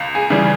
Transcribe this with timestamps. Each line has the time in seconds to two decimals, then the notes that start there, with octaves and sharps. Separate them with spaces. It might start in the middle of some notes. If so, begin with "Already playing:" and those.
Already playing: C#2
0.15 G#4
0.30 C#3 E3 G3